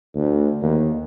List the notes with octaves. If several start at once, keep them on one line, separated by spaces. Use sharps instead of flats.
D2
D#2